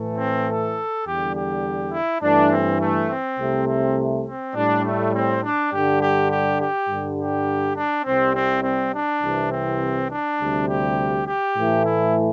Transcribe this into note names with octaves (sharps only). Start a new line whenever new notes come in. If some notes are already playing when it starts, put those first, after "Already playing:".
Already playing: A2 E3 A3
C4
A4
E2 D3 G3 G4
G4
E4
G2 E3 A3 D4
C4
A3
C4
C2 C3 A3
C4
C4
A2 G3 D4
A3
C4
D4
G2 D3 G3 G4
G4
G4
G4
G2 D3 G3
G4
D4
C2 C3 G3 C4
C4
C4
D4
C2 C3 E3
C4
D4
D2 C3 G3
G4
G4
A2 E3 A3
E4